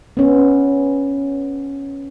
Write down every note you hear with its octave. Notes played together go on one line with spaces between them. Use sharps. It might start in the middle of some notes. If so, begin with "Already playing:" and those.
B3 C#4